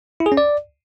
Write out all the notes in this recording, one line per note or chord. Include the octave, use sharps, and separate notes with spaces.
E4
G#4
C#4
D5